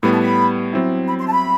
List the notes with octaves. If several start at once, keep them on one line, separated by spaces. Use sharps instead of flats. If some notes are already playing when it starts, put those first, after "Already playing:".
A2 G3 B3 B5
A5
B5
F#3 C4 E4
B5
C6
A5
B5